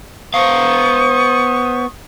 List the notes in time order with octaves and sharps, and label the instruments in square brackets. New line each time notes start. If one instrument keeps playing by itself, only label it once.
[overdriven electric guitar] B3 F5 [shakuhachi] C5 [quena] C#6 [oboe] D#6